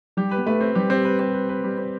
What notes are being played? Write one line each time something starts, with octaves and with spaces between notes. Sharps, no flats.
G3 G4
B4
B3
A3 B4
C4
G3 G4
C4
B4
C4
B4
B4
G3
C4